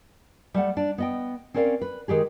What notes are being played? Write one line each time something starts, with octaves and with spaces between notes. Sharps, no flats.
G3 A3 F#5
D4 D5
B3 D#5 G5
C4 C#4 A#4 D5 D#5 F5
B4
D#3 G#3 G4 G#4